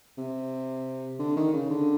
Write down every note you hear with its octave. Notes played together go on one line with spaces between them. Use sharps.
C3
D3
D#3
C#3
D3